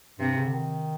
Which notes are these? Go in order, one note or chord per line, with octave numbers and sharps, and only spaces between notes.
G2 C3
C#3
D3
D#3